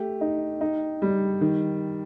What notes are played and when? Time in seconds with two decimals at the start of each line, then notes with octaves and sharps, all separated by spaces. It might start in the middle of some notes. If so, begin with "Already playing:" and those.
Already playing: A3 G4
0.21 D#4
0.61 D#4
1.02 G3
1.41 D#3